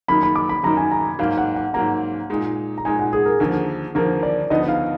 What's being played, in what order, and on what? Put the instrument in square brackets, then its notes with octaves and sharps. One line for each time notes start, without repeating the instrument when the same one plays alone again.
[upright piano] F#2 D#3 A#3 D#4 [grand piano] B5
[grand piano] B5
D6
B5
[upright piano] F#2 D#3 A#3 D#4 [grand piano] A#5
[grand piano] G#5
A#5
[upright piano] G#2 F#3 A#3 [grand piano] F5
[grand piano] F#5
F#5
[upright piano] G#2 F#3 A#3 [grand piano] A#5
[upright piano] A#2 G#3 D#4
[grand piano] A#5
[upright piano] A#2 G#3 D#4 [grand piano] G#5
[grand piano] F#5
G#4
A#4
[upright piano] D#2 D3 F3 A#3 [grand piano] G#4
[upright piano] D#2 D3 F3 A#3 [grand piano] A#4
[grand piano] D5
[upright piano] D2 D3 F3 B3 D#4 [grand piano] D#5
[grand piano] F5